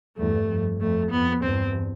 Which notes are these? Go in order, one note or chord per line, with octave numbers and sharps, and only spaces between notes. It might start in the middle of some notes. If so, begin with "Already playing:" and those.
E2 G2 A3
F2
F2 A3
F2 B3
E2 G2 C4